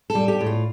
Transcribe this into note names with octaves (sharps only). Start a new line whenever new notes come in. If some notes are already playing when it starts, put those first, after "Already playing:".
A4
G3
G4
A2
F4